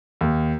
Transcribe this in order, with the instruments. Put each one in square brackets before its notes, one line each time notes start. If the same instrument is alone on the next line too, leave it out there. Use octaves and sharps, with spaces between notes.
[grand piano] D#2